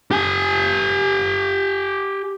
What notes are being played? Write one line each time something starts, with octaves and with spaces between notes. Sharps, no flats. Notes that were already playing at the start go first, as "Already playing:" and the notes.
G4 G#5